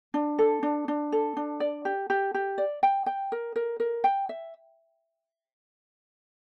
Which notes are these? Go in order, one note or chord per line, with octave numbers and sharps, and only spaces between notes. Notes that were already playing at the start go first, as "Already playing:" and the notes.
D4
A4
D4
D4
A4
D4
D5
G4
G4
G4
D5
G5
G5
A#4
A#4
A#4
G5
E5